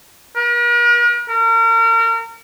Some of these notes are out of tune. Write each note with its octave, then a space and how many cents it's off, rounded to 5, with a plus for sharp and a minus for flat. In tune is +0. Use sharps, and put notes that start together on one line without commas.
A#4 +45
A#4 -35